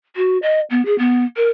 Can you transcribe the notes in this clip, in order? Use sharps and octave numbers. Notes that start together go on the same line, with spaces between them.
F#4
D#5
B3
G#4
B3
A#4